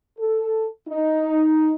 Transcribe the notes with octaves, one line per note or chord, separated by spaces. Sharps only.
A4
D#4